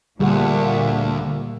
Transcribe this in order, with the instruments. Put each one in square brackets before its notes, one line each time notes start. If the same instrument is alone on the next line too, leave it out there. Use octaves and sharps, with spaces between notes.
[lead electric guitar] D2 [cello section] A#2 [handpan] G3 G#4 F#5